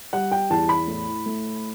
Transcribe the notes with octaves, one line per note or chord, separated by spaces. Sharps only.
G3 F#5
G5
E2 A5
B5
A2
A3